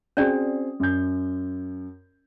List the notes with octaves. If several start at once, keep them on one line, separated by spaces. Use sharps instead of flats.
C4 C#4 F#4 G#4 D5
F#2 G6